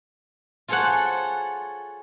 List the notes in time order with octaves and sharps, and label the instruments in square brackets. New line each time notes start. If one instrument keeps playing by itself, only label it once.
[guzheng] F4 G#4 A4 C5 C#5 F#5